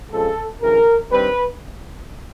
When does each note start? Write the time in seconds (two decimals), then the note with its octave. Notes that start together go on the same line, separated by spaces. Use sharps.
0.11 F2 C#3 F3 G#3 A4
0.62 D2 C#3 E3 A#4
1.12 G2 D#3 G3 C4 B4